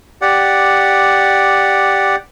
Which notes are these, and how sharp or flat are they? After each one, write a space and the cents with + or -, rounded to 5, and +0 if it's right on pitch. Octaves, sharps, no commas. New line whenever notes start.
G4 +0 D5 +0 F#5 +0